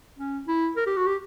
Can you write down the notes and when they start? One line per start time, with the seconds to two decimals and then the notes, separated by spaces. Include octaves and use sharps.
0.18 C#4
0.47 E4
0.76 A#4
0.86 G4
0.97 F#4
1.06 G4